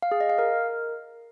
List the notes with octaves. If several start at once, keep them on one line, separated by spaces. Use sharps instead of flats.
F5
G#4
D#5
F5
A#4